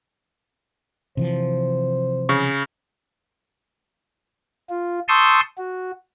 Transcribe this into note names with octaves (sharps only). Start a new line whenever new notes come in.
C3 E3 F3 C5
C#3 C#6
F4
A5 C6 C#6 D#6 E6 G6
F#4